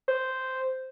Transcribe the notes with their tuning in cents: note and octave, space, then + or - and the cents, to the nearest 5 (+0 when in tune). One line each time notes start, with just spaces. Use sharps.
C5 -5